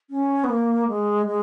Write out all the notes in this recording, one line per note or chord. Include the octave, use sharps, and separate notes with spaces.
C#4
B3
A#3
G#3
G#3